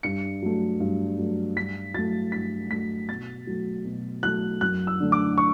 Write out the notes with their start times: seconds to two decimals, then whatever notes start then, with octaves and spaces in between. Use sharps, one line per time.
0.03 G2 C#7
0.42 F#3 A3
0.80 G2
1.18 F#3 A3
1.56 G2 B6
1.94 F#3 A3 A6
2.32 G2 B6
2.70 F#3 A3 B6
3.08 B2 A6
3.47 F#3 A3
3.85 B2
4.23 F#3 A3 F#6
4.61 F#2 F#6
4.87 E6
5.00 D3 A3
5.12 D6
5.38 C#6